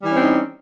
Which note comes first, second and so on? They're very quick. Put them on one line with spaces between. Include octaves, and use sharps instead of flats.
G3 E3 C#4 C4 D#4